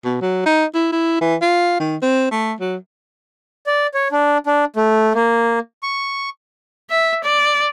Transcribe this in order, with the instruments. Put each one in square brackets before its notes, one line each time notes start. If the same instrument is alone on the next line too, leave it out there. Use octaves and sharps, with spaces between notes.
[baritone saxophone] B2
F#3
D#4
E4
E4
E3
F4
D#3
C4
A3
F#3
[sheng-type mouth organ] D5
C#5
D4
D4
A3
A#3
C#6
[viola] E5
D5